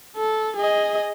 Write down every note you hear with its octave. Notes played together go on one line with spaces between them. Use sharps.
A4
G#4 D#5